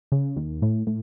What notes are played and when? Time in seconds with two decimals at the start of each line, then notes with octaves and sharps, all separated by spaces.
0.12 C#3
0.36 D#2
0.62 A2
0.87 A2